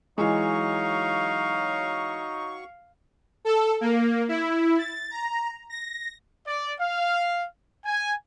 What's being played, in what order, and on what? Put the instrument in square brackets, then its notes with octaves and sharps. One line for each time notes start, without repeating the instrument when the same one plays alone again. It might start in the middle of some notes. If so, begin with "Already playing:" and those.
[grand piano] E3 G#3 [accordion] F#3 C#6 [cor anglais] D#4 [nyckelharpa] F5
[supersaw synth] A4
A#3
E4
A6
A#5
A#6
[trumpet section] D5
F5
G#5